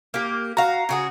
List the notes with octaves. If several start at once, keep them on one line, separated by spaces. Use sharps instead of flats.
A#3 G4
F#4 F5 A#5
C#3 F#4 G#4